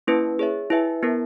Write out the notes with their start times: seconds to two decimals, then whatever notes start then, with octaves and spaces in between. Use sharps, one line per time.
0.07 A#3 C#4 E4 B4
0.39 G#4 C#5 E5
0.70 E4 B4 E5 G#5
1.03 B3 E4 A#4